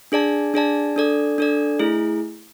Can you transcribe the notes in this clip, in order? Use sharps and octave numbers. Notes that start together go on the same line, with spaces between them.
D4 G#4 D5 A5
D4 G#4 D5 A5
D4 A4 D5
D4 A4 D5
A3 E4 G#4